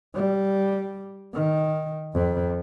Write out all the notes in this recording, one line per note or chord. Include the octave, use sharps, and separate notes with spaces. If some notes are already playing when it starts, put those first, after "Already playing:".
G3
D#3
F2